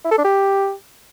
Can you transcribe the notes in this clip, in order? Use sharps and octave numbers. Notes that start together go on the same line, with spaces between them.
E4
A4
D4
G4